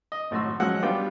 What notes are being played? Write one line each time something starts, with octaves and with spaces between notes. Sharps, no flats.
D#5
G#1 A2 F#3 F#4 C6 E6
F3 F#3 G#3 C#4 F#5 E6
G3 B3 D4 F4 G5